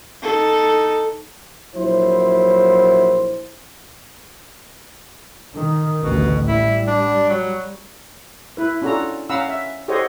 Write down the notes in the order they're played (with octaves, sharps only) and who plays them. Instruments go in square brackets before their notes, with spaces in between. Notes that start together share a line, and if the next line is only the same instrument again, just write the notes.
[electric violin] D#4 A4
[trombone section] A#1 F#3 E4 C5
[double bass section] D#3
[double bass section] A1 D2 [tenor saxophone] B2
[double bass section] G3 [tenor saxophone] E4
[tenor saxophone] D4
F#3
[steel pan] E4 B4
C#4 D4 F4 F#4 A4 A#5
C#4 F5 F#5 A#5 B5 E6
E5
G4 A4 C5 C#5 D#5 F#5